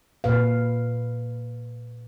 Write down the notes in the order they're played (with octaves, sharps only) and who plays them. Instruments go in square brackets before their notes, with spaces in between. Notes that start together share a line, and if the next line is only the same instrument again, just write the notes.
[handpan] A#2 B4 F5